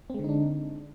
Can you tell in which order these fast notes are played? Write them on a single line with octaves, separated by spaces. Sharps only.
C4 G#3 D3 D#4 D4